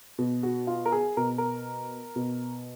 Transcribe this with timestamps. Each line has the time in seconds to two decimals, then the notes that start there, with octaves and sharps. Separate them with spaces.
0.18 B2
0.43 F#4
0.67 F4
0.86 A#4
0.92 G#4
1.17 B2 A#4
1.38 A#4
2.16 B2